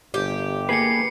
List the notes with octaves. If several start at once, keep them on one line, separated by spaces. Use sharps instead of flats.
G1 G4
A#3 G#4 B4 C7 C#7